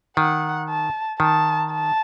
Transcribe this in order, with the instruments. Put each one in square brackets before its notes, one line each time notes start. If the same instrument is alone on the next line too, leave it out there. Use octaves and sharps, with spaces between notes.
[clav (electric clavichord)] D#3 [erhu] F#5
[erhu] A5
[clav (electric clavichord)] D#3 [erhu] A5
[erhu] A5